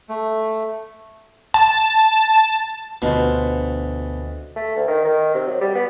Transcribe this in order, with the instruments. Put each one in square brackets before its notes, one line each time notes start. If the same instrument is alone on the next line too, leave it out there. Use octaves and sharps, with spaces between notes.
[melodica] A3
[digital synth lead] A5
[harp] D2 F4 C5 [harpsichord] B2
[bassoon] A3
D2
D#3
D#3
C3
F#3
G3
B3